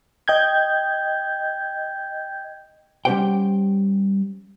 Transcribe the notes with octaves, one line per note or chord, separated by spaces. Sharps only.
D#5 G5 G6 G#6
G3 C#4 G4 C5 F#5 G5